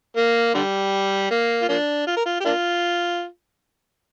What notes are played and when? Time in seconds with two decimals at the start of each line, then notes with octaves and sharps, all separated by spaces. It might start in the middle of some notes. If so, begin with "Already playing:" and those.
0.17 A#3
0.55 D3 G3
1.31 A#3
1.62 F4
1.69 F3 A#3 D4
2.07 F4
2.16 A#4
2.26 F4
2.40 G4
2.45 A#3 D4 F4